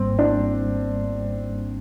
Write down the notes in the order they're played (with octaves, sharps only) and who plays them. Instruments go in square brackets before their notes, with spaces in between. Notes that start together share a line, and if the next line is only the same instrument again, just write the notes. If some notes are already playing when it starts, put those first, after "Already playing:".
Already playing: [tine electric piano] G#1 G#2 G3 A#3 [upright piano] C4
[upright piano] D4